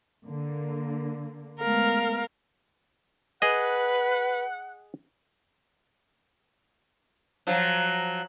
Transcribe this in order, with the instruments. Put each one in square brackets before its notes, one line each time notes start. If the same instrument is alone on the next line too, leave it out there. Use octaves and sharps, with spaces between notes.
[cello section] D3 A#3
[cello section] G#3 A3 B3 [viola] A#4 F5
[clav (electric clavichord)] G#4 D#5 [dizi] B4 [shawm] F#5
[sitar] F3 F#3